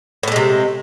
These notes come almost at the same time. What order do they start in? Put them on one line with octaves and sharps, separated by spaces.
A2 A3 G#3 C3